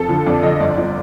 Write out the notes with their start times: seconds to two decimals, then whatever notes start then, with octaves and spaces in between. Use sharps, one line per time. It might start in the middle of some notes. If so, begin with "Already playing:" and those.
Already playing: F2 A4
0.08 D3 F3
0.26 F2 D5
0.43 D3 F3 D#5
0.60 G1 D5
0.77 F3